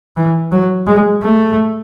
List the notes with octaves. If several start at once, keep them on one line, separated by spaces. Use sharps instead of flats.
E3
F#3
G#3
A3